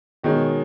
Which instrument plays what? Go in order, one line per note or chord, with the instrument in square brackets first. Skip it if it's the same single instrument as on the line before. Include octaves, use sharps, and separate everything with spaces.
[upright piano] B2 D#3 [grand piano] G#3 C#4 G#4 D#5